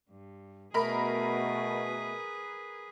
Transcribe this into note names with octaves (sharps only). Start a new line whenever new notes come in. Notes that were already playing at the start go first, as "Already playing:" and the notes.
G2
B2 A3 G#4 A#4 B4 B5